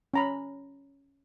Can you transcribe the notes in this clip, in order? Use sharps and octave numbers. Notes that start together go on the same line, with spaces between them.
C#4 A#5 B5